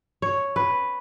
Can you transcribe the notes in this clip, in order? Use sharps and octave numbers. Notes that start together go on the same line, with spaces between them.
C#5
B4